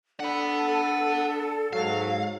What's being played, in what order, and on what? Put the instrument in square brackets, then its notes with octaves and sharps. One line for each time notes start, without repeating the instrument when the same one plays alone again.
[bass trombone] D4 [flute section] A4 [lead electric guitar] F#5 B5
[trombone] G#2 [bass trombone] F#3 [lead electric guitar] F5